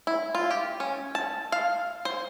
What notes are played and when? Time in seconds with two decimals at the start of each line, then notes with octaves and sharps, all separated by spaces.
0.07 E4
0.35 F4
0.51 G4
0.80 C#4
1.15 A5
1.52 F5
2.05 C5